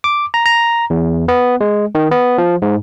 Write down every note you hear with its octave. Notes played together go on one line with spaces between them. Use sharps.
D6
A#5
A#5
E2
B3
G#3
D#3
B3
F3
G#2